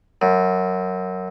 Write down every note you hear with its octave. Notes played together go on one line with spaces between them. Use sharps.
F#2